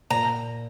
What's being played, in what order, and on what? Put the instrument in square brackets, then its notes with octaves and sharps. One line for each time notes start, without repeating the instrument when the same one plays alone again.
[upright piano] A#2 [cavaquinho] A#5